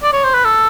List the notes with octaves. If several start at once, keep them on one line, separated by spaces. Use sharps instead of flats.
D5
C#5
C5
B4
A4